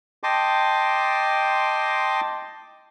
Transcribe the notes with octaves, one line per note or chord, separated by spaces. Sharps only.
D#5 G5 A5 C6 D6